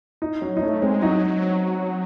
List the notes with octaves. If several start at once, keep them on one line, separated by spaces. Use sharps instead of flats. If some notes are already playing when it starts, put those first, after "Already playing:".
D#4
F#3 C#4
D#4
A3 C#4
G#3 C4
F#3 D#4